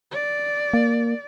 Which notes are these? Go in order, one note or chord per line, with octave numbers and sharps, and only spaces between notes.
D5
A#3